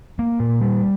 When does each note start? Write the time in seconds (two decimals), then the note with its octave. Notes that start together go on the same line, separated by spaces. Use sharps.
0.19 A#3
0.40 A#2
0.61 G3